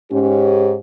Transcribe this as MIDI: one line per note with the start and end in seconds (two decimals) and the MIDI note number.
0.11 0.75 44
0.11 0.75 61
0.11 0.75 67